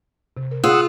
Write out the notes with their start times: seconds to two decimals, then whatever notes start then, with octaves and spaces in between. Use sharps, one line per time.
0.37 C3
0.51 A#4
0.64 F4 G#4 F#5 D#6 E6